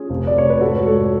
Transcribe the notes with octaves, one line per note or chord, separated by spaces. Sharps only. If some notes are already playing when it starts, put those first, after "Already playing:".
Already playing: C#4 F4 G#4
F1
D5
F1 C#5
B4
G#2 F#4 A4
G#2 A4 C#5